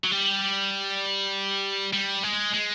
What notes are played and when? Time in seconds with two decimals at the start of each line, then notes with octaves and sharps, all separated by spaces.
0.04 F#3
0.12 G3
1.93 G3
2.23 G#3
2.54 G#3